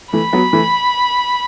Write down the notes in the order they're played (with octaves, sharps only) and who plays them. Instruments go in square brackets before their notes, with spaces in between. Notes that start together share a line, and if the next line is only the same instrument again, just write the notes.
[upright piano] E3 A3 [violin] B5
[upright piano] F#3 B3
E3 A3